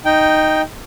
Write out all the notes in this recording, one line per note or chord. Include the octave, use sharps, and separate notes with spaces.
D#4 G5